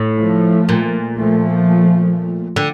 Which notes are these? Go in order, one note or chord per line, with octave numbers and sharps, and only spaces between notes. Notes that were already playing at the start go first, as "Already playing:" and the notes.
Already playing: A2
F3 A3
A#2
F3 A3
D3